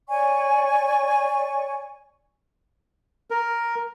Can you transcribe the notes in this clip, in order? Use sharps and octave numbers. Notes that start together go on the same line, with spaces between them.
C#5 D5 G#5 C#6
A#4